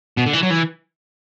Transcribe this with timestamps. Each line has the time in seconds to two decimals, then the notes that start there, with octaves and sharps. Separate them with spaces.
0.17 B2
0.26 D3
0.33 E3
0.43 F#3
0.50 E3